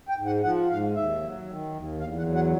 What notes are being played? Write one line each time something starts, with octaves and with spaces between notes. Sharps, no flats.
G5
G#2
F#5
F3 F#5
G#2 F5
D#2 E5
F#3
D#3
D#2
E2 F5
F#5
F#3
F#5